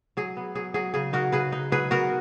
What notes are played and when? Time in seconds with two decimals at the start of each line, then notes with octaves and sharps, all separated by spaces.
0.17 F#3 G#4
0.37 B3
0.55 F#3 G#4
0.74 F#3 G#4
0.94 C#3 G#4
1.13 D#4 F#4 A#4
1.32 C#3 G#4 B4
1.52 D#4
1.72 F#3 G#4 B4
1.91 B3 F#4 A#4